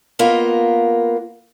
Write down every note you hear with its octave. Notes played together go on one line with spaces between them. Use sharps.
A#3 B3 F4 A#4 D#5